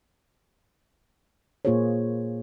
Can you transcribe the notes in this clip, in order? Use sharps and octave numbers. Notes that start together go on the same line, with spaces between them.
A#2 A#3 F4 G#4 C5 C#5